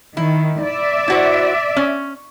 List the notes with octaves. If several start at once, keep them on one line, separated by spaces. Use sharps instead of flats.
D#3 E4
D5 E5
E4 F#4 C5
C#4